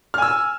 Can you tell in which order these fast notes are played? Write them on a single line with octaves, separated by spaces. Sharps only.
F6 G#5 E6